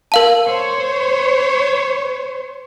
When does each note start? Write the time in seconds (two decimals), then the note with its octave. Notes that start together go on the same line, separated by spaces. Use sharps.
0.12 A#4 F5 A5
0.47 C5 C#5